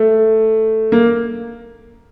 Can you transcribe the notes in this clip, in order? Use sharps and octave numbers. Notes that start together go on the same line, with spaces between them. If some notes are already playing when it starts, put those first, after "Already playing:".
Already playing: A3
A#3